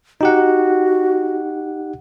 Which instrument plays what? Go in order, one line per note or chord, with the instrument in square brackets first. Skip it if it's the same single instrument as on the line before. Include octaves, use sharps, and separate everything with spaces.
[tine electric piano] D#4 G4 F#5 [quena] F#4